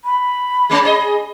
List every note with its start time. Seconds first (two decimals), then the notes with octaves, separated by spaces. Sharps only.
0.05 B5
0.70 G#3 A3 C#4
0.83 G#4 D5 D#5